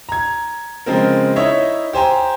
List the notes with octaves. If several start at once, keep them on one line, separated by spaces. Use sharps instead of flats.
A#5 G#6
C#3 F3 G#3 C4 A#4
D#4 E4 C#5 D#5 E5
G4 C5 G#5 A#5